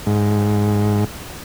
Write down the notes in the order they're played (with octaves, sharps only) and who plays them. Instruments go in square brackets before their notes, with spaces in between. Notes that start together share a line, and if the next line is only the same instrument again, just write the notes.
[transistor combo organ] G#2